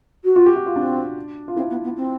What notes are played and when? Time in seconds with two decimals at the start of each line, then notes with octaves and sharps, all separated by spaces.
0.24 F#4
0.36 F4 F#4
0.46 G4
0.56 F#4
0.66 F4
0.76 C4 D4
1.48 F4
1.56 C4 E4
1.70 B3
1.84 B3
1.97 C4